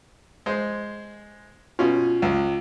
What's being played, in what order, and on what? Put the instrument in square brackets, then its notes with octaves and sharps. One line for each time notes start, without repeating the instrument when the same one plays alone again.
[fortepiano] G#3 C5
[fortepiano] B2 C#4 [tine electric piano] F4
[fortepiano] C#2